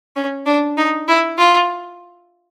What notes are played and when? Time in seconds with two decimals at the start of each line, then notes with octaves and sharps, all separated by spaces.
0.16 C#4
0.46 D4
0.77 D#4
1.08 E4
1.38 F4